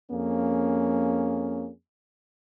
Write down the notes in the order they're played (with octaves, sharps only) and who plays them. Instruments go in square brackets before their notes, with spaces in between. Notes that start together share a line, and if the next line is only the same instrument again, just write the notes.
[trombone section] F2 A#3 C#4 G#4